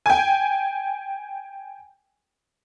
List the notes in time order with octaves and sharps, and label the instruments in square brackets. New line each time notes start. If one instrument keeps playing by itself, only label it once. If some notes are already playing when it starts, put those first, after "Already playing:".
[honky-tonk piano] G5 G#5